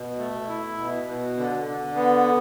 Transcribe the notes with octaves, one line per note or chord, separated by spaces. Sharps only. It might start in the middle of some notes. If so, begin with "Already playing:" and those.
Already playing: B2
A3
E4
B2
B2
D3
D3
B3